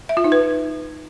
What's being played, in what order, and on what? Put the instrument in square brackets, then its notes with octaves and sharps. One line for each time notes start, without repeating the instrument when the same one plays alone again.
[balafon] E5
F4
D#4
B4